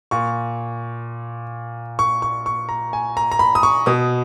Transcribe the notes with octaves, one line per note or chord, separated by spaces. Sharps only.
A#2 C#6
C#6
C#6
C#6
A#5
G#5
A#5
A#5
B5
D#6
C#6
B2 D#6